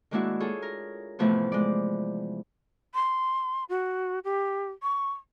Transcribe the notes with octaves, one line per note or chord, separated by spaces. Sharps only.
D#3 G#3 A#3 D4 E4 F#4
F4 G#4 A4 C#5
A#4
A2 C3 E3 F3 A3 B3
G#3 D5
C6
F#4
G4
C#6